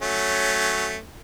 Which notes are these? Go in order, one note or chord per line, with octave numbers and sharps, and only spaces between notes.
F#3 A3 C#4